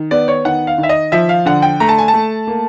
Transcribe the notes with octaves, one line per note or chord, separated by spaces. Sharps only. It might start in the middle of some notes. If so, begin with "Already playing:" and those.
Already playing: D#3
B3 D5
C#5
D#3 F#5
F5
D#3
E5
D#5
F3 E5
F5
D3 F#5
G5
A3 A#5
A5
G#5
A5
A3
A#3